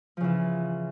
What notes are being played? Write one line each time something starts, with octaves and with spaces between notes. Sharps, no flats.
C#3 E3 F3